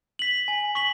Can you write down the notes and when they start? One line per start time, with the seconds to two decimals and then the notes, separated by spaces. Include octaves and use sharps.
0.19 B6 F#7
0.48 G#5
0.75 C#6 B6 F#7